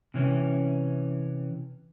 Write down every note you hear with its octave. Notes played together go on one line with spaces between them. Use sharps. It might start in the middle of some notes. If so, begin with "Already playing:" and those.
C3 E3 C#4